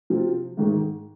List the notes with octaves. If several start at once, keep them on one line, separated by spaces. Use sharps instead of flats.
C3 F3 C4 F4
G#2 D#3 G#3